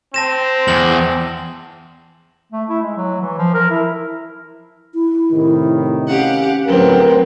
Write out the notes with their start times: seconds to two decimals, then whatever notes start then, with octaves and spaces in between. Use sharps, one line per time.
0.14 C4 A5 A#6 E7
0.68 E2 F#7
2.52 A3
2.69 E4
2.82 G#3
2.97 F#3
3.21 E3
3.38 F3
3.54 A#4
3.70 E4
4.94 E4
5.33 A2 C3 D#3
6.07 C#4 G4 F5 F#5
6.67 D2 A2 F#3 B3 C4 A#4